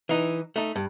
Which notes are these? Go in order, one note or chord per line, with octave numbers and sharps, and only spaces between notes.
E3 D#4
A3 D#4
G2